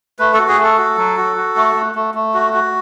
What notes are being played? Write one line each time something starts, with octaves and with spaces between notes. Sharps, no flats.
A3 B4
F#4 A4
G#4
A3 A4
F#4
F#3
F#4
F#4
A3
A3
A3
A3
F#4
F#4